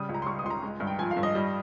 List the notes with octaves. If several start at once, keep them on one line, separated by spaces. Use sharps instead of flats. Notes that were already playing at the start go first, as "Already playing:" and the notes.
Already playing: C#3 G3 D#6
C#2
A#5
C6
G3 C#6
D#6
C#2 C6
A#5
G#3
G2
G5
F3 G#5
F5
G2
D#5
G3